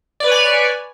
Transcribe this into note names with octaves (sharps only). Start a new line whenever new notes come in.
B4 C#5 D5 G#5